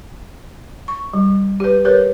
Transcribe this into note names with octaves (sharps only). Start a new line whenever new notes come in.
C#6
G3
G4 B4
G4 A#4 B4 C#5